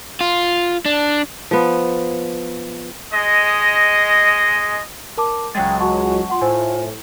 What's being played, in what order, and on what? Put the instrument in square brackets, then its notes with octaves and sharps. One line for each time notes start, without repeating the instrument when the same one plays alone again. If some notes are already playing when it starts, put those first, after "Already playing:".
[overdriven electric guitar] F4
D4
[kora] F3 B3
[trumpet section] G#3 D#5
[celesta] A#4 A5 D6
[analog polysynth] C#2 F#3 G#3 [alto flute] G5 [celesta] A6
[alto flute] F#4 [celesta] F#5 A5 C#6
[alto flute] F4 [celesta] F#5 C6
[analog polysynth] A2 [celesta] C5 G#5